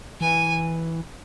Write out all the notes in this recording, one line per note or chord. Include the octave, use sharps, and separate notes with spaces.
E3 G#5